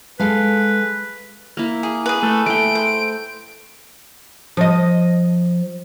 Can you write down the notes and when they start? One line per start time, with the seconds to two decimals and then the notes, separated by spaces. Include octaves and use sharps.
0.20 G#3 A4 B4 F5
1.57 A#3 E4
1.83 G#4
2.06 G#4 B4
2.23 A3
2.46 A3 G5 D7
2.75 C5
4.57 F3 D#5